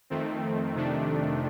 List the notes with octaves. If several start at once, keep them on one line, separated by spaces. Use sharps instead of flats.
F2 D#3 A3 C4
F2 C3 D#3 A3 D4